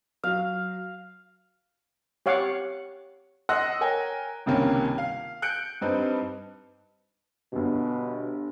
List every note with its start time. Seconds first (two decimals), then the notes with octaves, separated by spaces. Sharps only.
0.23 F#3 F#4 F5
2.26 G4 C#5 F5 F#5 D6
3.49 D#5 F#5 C6 E6 F#6 A#6
3.81 A#4 C#5 G5 G#5 A#5
4.46 C#2 G2 C3 D#3 A#3 C#4
4.98 F5
5.42 F#6 G6 C#7 D7
5.81 G2 C4 D#4 B4
7.52 G1 G2 B2